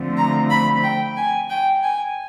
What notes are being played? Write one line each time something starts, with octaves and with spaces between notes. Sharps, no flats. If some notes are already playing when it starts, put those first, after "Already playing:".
Already playing: D3 F3 A3 C4
A#5
B5
G5
G#5
G5
G#5